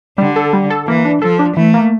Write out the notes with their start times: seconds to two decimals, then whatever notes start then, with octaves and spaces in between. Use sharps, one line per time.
0.18 D3 G3
0.36 A4
0.53 G3
0.70 A4
0.87 E3 A#3
1.05 D4
1.22 F3 A4
1.39 D4
1.56 E3 A3
1.74 A#3